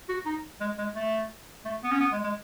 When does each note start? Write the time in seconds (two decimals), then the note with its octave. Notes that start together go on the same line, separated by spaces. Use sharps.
0.09 F#4
0.26 D#4
0.60 G#3
0.78 G#3
0.95 A3
1.65 A3
1.83 B3
1.91 C#4
2.00 B3
2.12 G#3
2.23 G#3